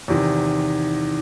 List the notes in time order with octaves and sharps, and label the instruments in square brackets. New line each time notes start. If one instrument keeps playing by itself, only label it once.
[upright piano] E2 C3 D#3